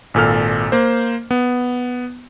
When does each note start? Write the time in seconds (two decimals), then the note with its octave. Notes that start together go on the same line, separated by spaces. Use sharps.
0.14 G#1 A#2 A4 F6
0.72 A#3 C5
1.31 B3